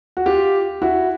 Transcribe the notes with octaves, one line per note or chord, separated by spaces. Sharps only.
F#4
F4 G4
E4 F#4